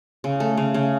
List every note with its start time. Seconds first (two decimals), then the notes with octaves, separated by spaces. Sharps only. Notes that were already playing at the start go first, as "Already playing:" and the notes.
0.24 C#3
0.40 A3
0.57 C#3
0.74 C#3